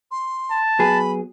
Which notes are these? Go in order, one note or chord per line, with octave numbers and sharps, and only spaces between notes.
C6
A5
F#3 B3 G#4 B5